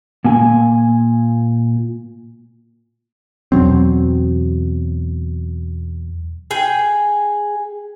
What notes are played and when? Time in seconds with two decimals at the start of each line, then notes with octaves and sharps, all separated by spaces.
0.25 A#2 A#3 G#5
3.52 E2 B2 F#3 C4
6.51 G#4 G5